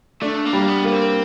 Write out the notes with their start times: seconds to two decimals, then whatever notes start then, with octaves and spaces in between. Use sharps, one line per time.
0.22 A3 D4
0.45 A#3
0.53 G3
0.68 B3
0.84 A#3 B3
0.92 C4